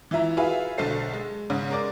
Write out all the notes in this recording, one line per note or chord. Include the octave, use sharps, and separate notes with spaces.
E3 E4 F4 E5 A#5
F4 F#4 G#4 B4 E5 F5
B1 D3 A4 C5 C7
G#3
G#2 C#3 C#4
G#3 A#4 D5 D6